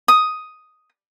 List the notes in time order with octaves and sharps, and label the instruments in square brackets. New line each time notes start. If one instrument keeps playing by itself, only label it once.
[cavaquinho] D#6